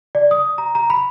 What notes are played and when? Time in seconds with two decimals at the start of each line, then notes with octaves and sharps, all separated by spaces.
0.15 D5
0.31 D#6
0.58 A#5
0.75 A#5
0.90 B5